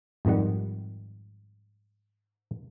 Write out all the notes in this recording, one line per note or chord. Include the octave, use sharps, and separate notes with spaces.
G#1 F2 D#3 G3 F#5